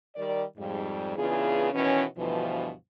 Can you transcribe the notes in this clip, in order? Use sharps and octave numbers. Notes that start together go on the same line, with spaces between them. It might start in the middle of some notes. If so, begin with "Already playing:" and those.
D#3 G3 A#4 D5
F2 G#2 G3
C#3 E3 B3 D4 F4 G#4
B2 D#3 E3 C#4
D2 G2 B2 E3 F3